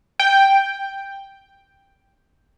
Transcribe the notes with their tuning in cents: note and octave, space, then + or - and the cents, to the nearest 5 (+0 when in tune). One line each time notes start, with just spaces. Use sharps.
G5 +5